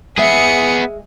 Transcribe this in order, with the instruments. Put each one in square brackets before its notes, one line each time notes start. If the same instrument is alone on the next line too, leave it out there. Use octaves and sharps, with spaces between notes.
[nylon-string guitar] G#3 E5 [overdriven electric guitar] B3 G#4 [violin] D#6 C#7